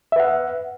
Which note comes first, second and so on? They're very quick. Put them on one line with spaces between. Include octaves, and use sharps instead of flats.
E5 B4 F#5